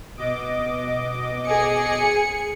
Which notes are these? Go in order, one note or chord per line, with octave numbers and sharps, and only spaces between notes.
B2 D#5 D6
G#4 C#7